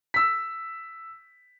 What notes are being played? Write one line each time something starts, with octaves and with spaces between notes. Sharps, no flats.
E6 B6